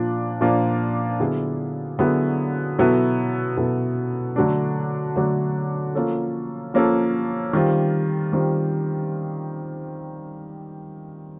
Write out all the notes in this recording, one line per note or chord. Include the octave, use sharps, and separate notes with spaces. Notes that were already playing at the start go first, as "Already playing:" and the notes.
Already playing: A#2 F3 A#3 D4 F4
A#2 F3 A#3 D4 F4
D3 F#3 B3 E4 G#4
D3 F#3 B3 E4 G#4
B2 F#3 B3 E4 A4
B2 F#3 B3 E4 A4
D3 F#3 A3 D4
D3 F#3 A3 D4
F3 A#3 C#4 F4 A4
F3 A#3 C#4 F4 A4
D#3 G3 C4 F4
D#3 G3 C4 F4